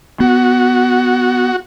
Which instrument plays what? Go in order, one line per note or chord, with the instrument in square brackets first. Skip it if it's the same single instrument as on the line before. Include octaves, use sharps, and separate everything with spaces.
[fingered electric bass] B3 [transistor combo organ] F#4